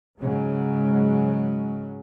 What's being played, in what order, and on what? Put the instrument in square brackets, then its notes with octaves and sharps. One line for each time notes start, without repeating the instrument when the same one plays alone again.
[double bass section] G#2 C#3 F#3 G#3